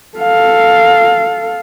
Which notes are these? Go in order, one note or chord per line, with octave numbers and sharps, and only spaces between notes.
A4 F5